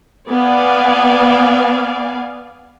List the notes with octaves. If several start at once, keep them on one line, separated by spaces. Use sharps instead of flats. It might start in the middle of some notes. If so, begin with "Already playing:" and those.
B3 D5 F5 G#5